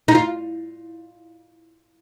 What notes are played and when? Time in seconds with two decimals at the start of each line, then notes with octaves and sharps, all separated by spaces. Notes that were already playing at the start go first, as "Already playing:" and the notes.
0.08 D#4
0.15 F4